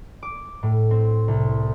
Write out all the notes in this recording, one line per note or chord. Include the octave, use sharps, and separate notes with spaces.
D6
A2
C4
C2